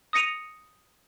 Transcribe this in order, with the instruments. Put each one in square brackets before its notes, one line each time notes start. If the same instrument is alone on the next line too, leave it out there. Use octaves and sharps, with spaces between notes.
[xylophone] D#6 A#6 C#7 D#7 F7